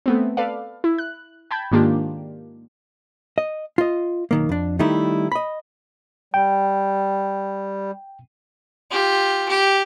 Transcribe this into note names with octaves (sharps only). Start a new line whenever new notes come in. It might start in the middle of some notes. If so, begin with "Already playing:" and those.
A3 B3 C4
A4 B4 D5 F5
E4
F#6
G5 A5 B5 G6 G#6
G#2 D#3 A#3 D4 F4 G4
D#5
F4 D#5
B1 D#3 A#3
F2 D4
D#3 G3 A3 D#4 E4
D#5 B5
G3 G5
F4 G4
G4